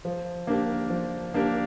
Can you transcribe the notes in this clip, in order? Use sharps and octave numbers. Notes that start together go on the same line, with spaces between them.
F3
A#3 D4 G4 A#4
F3
A#3 D4 G4 A#4